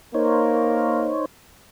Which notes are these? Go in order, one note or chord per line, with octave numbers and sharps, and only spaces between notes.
A#3 D#4 A#4 C5 C#5